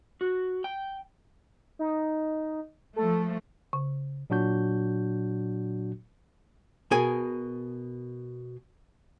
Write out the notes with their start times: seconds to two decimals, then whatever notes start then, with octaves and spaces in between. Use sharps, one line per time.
0.21 F#4
0.64 G5
1.79 D#4
2.96 F3 A3 A4
3.73 C#3
4.30 A#2 F#3 D4 F#4 G6
6.91 B2 G#4 A#4 G#5